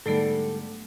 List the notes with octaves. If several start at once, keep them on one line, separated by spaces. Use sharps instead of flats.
G#2 D3 F#3 G3 A3 B3 A4